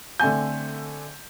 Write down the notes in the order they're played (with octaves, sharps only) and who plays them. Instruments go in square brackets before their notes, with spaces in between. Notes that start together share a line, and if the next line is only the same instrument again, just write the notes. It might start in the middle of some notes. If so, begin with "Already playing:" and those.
[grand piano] D3 A3 C4 G#5 G6